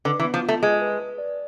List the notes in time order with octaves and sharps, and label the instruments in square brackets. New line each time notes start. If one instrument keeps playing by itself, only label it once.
[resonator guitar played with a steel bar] D3 [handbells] B4
[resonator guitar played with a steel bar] E3
[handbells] B3
[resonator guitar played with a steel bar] F3
[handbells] F4
[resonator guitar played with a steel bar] A3
[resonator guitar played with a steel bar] G#3 [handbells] B4
[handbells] B4
B4
D5